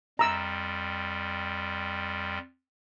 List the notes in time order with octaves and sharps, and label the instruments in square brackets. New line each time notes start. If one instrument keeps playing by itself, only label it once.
[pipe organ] F2 G3 [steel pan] A#5 E6